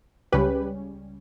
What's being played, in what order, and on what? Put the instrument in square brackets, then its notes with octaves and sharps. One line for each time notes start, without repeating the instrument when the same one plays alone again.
[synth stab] C#2 C#3 G3 C#4 G4 B4